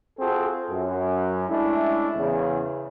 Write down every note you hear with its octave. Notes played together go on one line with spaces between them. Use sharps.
C4 F4 F#4 G#4 A4
F#2
G#3 A3 C#4 D4 E4
E2 C#3